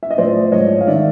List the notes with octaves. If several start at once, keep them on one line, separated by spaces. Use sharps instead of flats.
E5
D#5
A2 F3 C5 D5
G#2 F3 C#5 D#5
F5
D#3 D5 E5